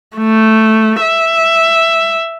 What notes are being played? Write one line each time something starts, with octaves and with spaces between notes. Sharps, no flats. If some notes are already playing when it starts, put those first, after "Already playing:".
A3
E5